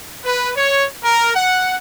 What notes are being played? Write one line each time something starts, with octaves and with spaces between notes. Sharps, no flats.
B4
C#5
A#4
F#5